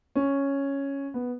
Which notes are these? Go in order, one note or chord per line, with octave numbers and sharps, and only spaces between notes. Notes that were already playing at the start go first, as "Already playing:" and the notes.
C#4
B3